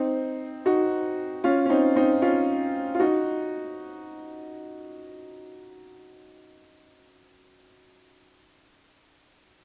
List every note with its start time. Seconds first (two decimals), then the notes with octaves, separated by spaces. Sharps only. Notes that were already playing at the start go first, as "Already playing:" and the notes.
Already playing: C4 D#4
0.66 D#4 F#4
1.44 C#4 F4
1.66 C#4
1.69 C4 D#4
1.95 C4 D#4
2.22 C#4 F4
2.95 F4
2.99 D#4 F#4